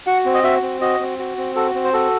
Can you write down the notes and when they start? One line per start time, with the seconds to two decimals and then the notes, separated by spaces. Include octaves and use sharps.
0.07 F#4 F#5
0.25 C4
0.34 D#5
0.43 F#4 E5
0.62 C4
0.81 F#4 D#5
1.00 C4
1.19 F#4
1.37 C4
1.56 F#4 A4
1.75 C4
1.84 C5
1.93 F#4 A4